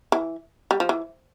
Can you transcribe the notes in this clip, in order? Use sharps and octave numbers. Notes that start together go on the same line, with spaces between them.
E3
G3
F3
E3